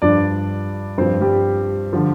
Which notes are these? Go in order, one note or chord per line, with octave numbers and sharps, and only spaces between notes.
G2 F3 D4 D5
G2 F3 C4 C5
G3 G4
D3 F3